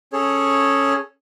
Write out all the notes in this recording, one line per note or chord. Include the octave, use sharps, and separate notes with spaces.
C#4 G#4 A4 C#5